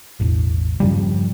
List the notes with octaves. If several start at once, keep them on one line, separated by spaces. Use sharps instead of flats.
E1 A1
G2 C#3 F3 G3